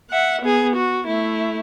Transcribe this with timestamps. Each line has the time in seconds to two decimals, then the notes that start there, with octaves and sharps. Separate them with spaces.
0.10 E5 F#5
0.41 B3 G#4
0.76 F#4
1.06 A3 E4